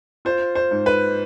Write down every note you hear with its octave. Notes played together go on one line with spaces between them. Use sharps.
F4 C5
C5
G#2
B4